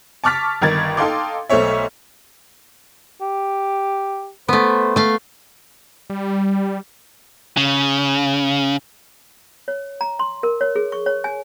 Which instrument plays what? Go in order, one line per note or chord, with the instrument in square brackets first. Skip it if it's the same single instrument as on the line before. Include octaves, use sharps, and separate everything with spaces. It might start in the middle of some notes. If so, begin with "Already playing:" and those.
[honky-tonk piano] A5 C#6 D6 F6 A6 B6
G1 D#3 A#4 G#6 A6
D#4 A4 F5 G5 C6 D6
B1 A3 C5 C#5 E5
[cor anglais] G4
[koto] A3 B3 [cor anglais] C5
[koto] A3 F5
[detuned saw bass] G3
[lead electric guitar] C#3
[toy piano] C#5
A#5
C6
A#4
C#5
G#4
C#6
C#5
G#5